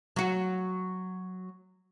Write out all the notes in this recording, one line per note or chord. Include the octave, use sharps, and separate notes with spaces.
F#3 F#4